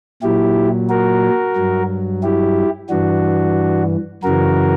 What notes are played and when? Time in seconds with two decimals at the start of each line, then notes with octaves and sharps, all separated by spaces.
0.22 A#2 F#3 E4 G4
0.89 F#4 A#4
1.56 G2 F#3
2.23 E4 G4
2.89 G2 E3 D4 F#4
4.23 F#2 C#3 E3 F#4 A#4